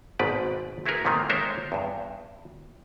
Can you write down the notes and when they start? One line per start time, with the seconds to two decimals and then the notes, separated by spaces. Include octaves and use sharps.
0.19 G#1 G#2 B2 B4 D5
0.86 A3 E4 F#4 G#4 A#4 B4
1.05 G#2 C3 D#3 A3 A#3
1.29 G#3 D4 A#4 C5 C#5 E5
1.72 E2 G2